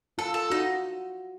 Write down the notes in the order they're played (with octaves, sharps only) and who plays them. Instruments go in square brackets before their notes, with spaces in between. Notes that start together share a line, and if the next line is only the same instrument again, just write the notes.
[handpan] F4 [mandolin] A4
[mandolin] A4
[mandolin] D#4 [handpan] F#4